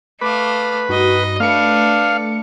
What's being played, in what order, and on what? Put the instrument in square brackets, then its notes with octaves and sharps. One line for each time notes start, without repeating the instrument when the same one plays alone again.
[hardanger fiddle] A3 F5 [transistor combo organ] B4 [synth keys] D6
[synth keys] G2 F#4 [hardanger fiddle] D#4 D#5
[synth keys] A3 C#7 [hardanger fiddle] D4 B4 [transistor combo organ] F5